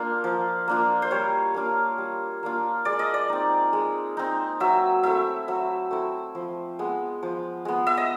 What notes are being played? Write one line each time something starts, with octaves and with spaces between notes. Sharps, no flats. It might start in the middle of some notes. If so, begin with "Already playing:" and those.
Already playing: A#3 D4 F4
F3
A#3 D4 F4
C5
G3 C#5
A#3 D4 F4
G3
A#3 D4 F4
G#3 D5
D#5
D5
C4 D#4
G#3
C4 D#4
F#3 E5
A3 C4 E4 E5
F#3 E5
A3 C4 E4
F3
G#3 B3
F3
G#3 B3
E5
D#5